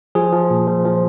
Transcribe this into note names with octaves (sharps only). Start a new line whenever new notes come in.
F3 G#4
F3
A#2
F3
F3